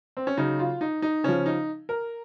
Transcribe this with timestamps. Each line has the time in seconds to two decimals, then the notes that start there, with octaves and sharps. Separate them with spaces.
0.17 C4
0.27 C#4
0.37 C#3 F#3 D#4
0.59 F4
0.81 D#4
1.02 D#4
1.24 C#3 F3 C#4
1.46 D#4
1.89 A#4